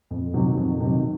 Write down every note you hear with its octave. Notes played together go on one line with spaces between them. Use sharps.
F2
C3 D#3 F#3
F2
C3 D#3 F#3